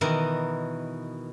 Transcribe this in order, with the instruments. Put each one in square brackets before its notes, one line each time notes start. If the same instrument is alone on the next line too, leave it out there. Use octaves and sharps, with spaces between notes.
[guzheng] B2 D#3 E3 E4 A#4